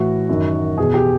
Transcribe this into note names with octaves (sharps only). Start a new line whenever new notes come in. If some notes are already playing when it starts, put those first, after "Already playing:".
Already playing: A2 E3 F#4
F#2 D#3
E2 B2 G#4
G4